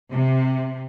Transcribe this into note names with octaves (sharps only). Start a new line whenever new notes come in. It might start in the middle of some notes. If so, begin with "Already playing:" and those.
C3